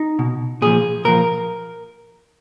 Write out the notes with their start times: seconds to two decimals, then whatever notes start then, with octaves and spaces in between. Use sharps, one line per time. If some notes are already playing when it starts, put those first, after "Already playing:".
Already playing: D#4
0.19 B2
0.62 A#2 F3 G#4
1.05 A#2 F3 A#4